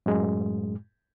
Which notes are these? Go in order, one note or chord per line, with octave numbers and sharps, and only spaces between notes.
F#2 A2 G#3